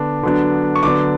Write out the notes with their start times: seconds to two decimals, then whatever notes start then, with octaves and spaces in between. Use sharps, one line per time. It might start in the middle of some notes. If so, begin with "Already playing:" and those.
Already playing: D3 B3 D4
0.23 D3 F#3 B3 D4
0.75 C#6
0.83 D3 F#3 B3 D4 D6